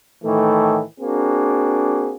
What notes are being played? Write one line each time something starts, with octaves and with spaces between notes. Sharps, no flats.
A2 D#3 E3 A3
A#3 C4 D4 F#4 G#4